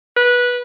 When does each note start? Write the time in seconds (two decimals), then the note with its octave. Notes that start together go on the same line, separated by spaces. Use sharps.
0.17 B4